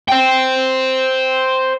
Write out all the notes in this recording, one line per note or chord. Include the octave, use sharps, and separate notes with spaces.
C5 G5